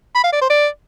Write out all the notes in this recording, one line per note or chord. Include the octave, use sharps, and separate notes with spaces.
B5
F5
D5
C5
D5